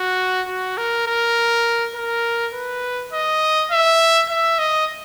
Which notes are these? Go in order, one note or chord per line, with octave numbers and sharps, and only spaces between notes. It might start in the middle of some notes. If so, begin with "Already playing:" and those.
Already playing: F#4
F#4
A#4
A#4
A#4
B4
D#5
E5
E5
D#5